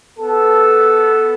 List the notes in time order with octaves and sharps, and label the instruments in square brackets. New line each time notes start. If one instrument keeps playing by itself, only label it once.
[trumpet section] B3 A4